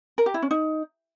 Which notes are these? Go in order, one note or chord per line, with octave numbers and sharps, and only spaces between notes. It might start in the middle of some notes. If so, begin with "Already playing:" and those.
A#4
G4
E4
C#4
D#4